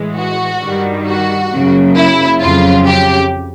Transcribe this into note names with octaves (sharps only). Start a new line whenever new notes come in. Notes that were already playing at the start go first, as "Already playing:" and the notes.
Already playing: A2 E3 G#3
F#4
G2 D#3 G3
F#4
F#2 C#3 F#3 A#3
E4
F2 C#3 F#3 F4
G4